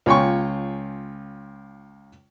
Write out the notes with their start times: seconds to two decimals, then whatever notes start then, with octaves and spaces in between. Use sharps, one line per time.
0.06 C#2 F4 C#5 G5 G#5 C#6